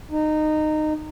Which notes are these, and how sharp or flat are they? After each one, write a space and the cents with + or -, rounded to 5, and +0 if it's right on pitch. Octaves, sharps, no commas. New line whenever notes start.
D#4 -20